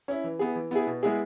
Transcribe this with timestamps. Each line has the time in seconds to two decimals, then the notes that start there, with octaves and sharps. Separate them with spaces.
0.08 C#4 E4
0.24 E3
0.39 B3 E4 G#4
0.55 E3
0.71 B3 E4 G#4
0.87 B2
1.03 G#3 B3 E4 G#4